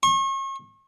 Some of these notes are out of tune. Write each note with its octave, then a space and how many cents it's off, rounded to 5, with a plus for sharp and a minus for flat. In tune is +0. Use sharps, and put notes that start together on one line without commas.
C#6 -35